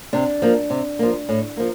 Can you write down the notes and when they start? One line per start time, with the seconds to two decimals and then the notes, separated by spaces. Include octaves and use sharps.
0.13 C3 D4
0.42 F3 A#3
0.70 C3
0.99 F3 A#3
1.29 A2
1.57 F3 A#3